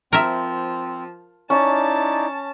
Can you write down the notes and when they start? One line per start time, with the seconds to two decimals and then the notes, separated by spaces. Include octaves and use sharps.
0.13 F3 C4 A#4 E5
1.50 C#4 D#4 E4 D5 A5